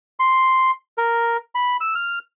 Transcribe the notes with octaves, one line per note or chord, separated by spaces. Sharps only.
C6
A#4
B5
E6
F6